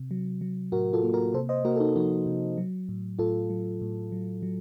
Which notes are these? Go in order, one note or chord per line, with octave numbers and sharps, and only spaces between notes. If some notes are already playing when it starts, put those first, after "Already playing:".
Already playing: C3
F#3
F#3
A2 F#4 A#4
F4 A4
A#3
F#4 A#4
C3 A4 C5
C5 D#5
A#3 F#4 A#4
A4
D#4 F#4
F3 D#4 F#4
C3
F#3
A2
A2 F4 A4
F#3
A2
F#3
F#3